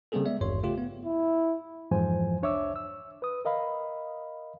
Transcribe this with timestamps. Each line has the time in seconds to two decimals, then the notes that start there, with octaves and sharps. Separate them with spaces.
0.12 C#3 G3 A#3 C4 G#4 A4
0.25 G#3 B3 D5 E5
0.41 G#1 E2 G2 C#5 C6
0.63 C#3 A3 F4 G4
0.78 B3
1.05 E4
1.91 F2 G#2 E3 F3 C5 G#5
2.42 C2 D4 C#5 E5 D6 E6
2.76 E6
3.22 B4 D#6
3.45 A#4 D#5 F5 B5